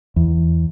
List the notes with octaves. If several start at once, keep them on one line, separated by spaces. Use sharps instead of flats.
E2